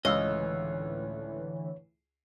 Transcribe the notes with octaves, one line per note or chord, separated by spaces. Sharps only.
C#2 A2 D3 E3 C#5 D#5 F5 E6